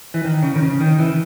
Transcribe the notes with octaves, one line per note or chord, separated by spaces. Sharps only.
E3
D#3
C#3
D#3
C#3
D#3
E3